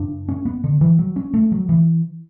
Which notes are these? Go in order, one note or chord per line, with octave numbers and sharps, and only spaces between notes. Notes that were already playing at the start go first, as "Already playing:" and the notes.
Already playing: F#2 C#3 D4
C#4
B3
D3
E3
F#3
C#4
A3
F#3
E3